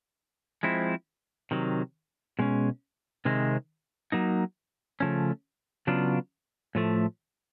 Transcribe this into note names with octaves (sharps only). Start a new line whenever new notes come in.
F3 G#3 C4 E4
C3 D#3 F#3
B2 G#3 C#4
C3 D#3 G#3 C4
F#3 A#3 D#4
C#3 F3 A3 C#4
C#3 F#3 B3 D4 F4
A2 F3 A3